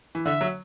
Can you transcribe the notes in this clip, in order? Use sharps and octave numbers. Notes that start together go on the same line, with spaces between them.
E3
D3 E5
F#3